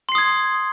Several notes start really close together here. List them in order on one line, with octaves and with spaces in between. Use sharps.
C6 C7 D#6 G#6